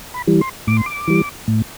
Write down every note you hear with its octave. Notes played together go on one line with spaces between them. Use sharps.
B5
E3 G3
C6
A2 D6
C6
D6
E3 G3
A2